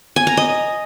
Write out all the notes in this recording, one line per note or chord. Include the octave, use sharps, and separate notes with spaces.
G#5
A#5
D#5